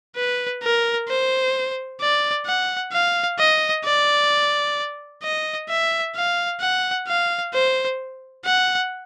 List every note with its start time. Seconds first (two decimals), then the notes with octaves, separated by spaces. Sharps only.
0.16 B4
0.63 A#4
1.09 C5
2.01 D5
2.46 F#5
2.93 F5
3.39 D#5
3.85 D5
5.23 D#5
5.69 E5
6.16 F5
6.61 F#5
7.08 F5
7.54 C5
8.45 F#5